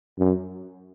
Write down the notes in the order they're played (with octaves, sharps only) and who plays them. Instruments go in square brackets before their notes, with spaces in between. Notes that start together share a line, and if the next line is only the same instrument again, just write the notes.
[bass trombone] F#2